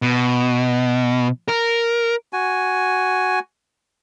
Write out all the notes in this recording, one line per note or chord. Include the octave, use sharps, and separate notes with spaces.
B2
A#4
F#4 G#5